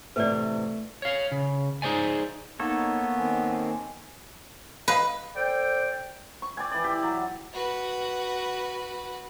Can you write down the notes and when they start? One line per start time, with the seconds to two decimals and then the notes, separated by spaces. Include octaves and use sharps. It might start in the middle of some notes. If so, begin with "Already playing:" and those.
0.16 A2 C3 E3 A3 B4 D5
1.02 C#5 F5
1.32 C#3
1.82 D#4 G#4 C5 D5 G#5
2.60 A#3 B3 D#4 A4 C#5
3.17 D#3 C4 G#5
4.88 B4 D#5 F5 B5
5.35 A4 C5 D5 G5
6.42 C#6
6.57 D5 G5 G#5
6.71 E3 D5
6.84 G4
7.03 F#3
7.54 F#4 B4